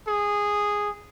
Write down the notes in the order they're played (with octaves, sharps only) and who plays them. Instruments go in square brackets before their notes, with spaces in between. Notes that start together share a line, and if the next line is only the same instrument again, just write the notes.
[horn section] G#4